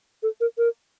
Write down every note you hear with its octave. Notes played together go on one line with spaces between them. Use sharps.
A4
A#4
A#4